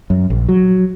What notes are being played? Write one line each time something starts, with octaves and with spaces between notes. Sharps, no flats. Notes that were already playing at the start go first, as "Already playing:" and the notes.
F#2
A#1
F#3